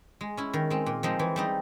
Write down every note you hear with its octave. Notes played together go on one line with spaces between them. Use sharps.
G#3
C#4 E4
D#3
G#3 C4
A#2
F3 G#3 C4 D#4
E3
G3 C4 D#4